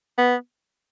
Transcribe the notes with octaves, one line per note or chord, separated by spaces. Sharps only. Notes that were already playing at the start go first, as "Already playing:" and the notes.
B3